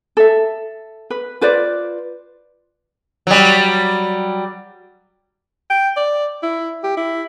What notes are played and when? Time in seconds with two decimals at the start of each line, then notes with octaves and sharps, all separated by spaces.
0.17 A4 E5
1.10 B4
1.41 F4 B4 C5 D5
3.27 F#3 G3
5.70 G5
5.97 D5
6.43 E4
6.83 G4
6.97 E4